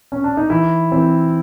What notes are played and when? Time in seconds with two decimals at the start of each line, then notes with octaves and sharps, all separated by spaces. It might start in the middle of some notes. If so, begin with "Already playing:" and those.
0.12 C#4
0.24 D4
0.37 D#4
0.50 E3 E4
0.92 E3 C4